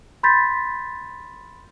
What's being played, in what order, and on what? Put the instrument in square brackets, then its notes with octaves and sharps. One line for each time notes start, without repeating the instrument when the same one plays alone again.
[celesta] B5 C6 G6 A6 B6